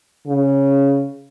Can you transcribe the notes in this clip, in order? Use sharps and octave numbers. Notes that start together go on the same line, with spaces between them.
C#3